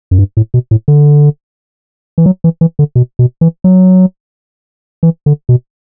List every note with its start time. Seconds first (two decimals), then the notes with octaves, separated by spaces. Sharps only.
0.11 F#2
0.19 G2
0.37 A2
0.54 B2
0.71 A2
0.88 D3
2.18 E3
2.26 F#3
2.44 E3
2.61 E3
2.79 D3
2.95 B2
3.19 B2
3.41 E3
3.64 F#3
5.03 E3
5.26 D3
5.49 B2